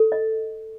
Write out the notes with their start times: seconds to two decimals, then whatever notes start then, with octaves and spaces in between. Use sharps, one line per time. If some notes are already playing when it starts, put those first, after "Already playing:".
Already playing: A4
0.12 D#5